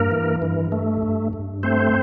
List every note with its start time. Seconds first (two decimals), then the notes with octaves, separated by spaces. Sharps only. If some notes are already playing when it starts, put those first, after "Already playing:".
Already playing: G2 A#3 A#4
0.11 E3
0.42 G2
0.72 A3
1.02 G2
1.33 G2
1.63 A3 C4 C5